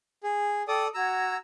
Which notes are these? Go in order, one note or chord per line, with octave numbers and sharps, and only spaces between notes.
G#4
A4 D5 G5 D#6
F#4 A#5 E6 G#6